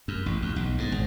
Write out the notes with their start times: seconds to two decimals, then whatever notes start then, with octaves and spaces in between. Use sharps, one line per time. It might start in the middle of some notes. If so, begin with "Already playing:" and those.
0.08 F#2
0.26 A1
0.42 D#2
0.56 B1
0.78 G#2
0.92 G#1